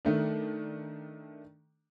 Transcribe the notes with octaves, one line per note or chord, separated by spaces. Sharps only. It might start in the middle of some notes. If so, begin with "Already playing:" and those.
D#3 A3 D4